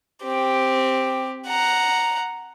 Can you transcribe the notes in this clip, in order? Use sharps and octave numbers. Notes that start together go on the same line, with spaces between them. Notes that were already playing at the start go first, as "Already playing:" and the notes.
C4 G4
F#5 A#5